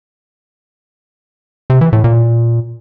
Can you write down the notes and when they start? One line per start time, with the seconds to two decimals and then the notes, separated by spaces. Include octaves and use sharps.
1.70 C3
1.81 E3
1.93 A2
2.04 A#2